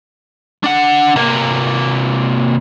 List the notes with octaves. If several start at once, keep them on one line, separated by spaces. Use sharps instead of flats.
D4 F#5
C3 A#3